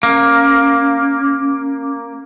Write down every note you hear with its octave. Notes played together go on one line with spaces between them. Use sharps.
A#3 C#4